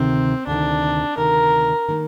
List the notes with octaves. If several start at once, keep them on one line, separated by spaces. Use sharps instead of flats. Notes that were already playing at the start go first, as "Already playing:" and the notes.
Already playing: D2 C3 D#3 C4
D2 C3 D#3 D4
D2 C3 D#3 A#4
D#3 A#3